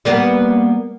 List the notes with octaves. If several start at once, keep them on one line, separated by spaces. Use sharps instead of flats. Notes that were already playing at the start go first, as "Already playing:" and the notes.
G3 A#3 B3